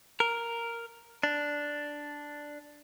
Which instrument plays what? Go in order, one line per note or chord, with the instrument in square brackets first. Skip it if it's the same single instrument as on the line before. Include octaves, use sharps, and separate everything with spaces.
[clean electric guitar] A#4
D4